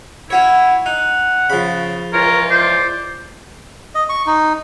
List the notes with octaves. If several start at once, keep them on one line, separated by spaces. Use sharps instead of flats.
C#4 E4 F#4 C#5
D#4 F#5
C#3 F3 B5
C#2 E3 F4 A#4 C#5
C5 D5
D#5
C#6
D#4